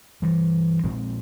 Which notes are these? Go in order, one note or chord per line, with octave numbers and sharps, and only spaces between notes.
G2 E3 G3
A#2 F3 G#3 C4